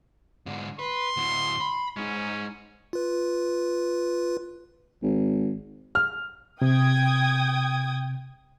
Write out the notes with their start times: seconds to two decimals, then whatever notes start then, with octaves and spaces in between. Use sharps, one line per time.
0.46 G#2 D3
0.79 B4 C6
1.17 D2 A2
1.60 B5
1.97 G#3 C#4 D#4
2.93 F4 B4
5.03 G#1
5.95 F6
6.62 C3 G5 D#6 G#6